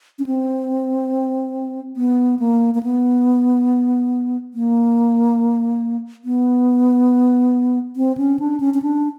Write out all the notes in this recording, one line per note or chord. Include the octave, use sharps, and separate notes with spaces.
C#4
C4
B3
A#3
A#3
B3
A#3
B3
C4
C#4
D4
C#4
C#4
D4